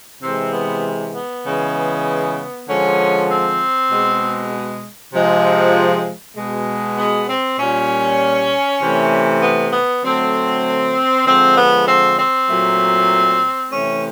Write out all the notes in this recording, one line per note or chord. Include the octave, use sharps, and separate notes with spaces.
C3 E3 G#3 C4
B3
B3
C#3 E3 G#3
D3 F3 G#3 C#4
C4
B2 G#3
C3 F3 G#3
B2 G#3
B3
C4
A#2 G3 C#4
C3 E3 A3
B3
B3
D3 F#3 A3 C4
D3 F3 G#3 C4
B3
C4
C4
A#2 F#3 A3
C3 E3 A3 C#4